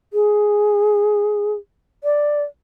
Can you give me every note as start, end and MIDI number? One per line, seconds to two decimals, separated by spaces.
0.13 1.53 68
2.04 2.44 74